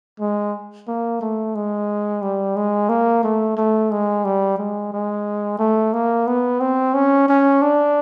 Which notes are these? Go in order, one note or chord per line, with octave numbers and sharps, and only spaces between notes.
G#3
A#3
A3
G#3
G3
G#3
A#3
A3
A3
G#3
G3
G#3
G#3
A3
A#3
B3
C4
C#4
C#4
D4